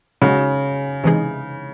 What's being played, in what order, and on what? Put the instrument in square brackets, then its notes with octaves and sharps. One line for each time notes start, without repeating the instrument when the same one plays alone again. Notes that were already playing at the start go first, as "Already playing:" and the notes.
[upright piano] C#3 [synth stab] G#3 D#4 F#4
[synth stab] C3 E3 G#3 D#4 G#4